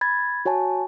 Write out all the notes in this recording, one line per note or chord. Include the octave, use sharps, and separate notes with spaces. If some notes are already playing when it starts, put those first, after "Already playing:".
B5 G#6 A6
F#4 C#5 G#5 A5